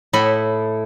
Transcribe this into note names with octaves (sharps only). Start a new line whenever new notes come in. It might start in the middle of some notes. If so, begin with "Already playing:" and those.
A2 E4 A4 D#5 B5